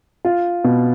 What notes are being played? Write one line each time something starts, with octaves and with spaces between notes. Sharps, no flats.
F4
B2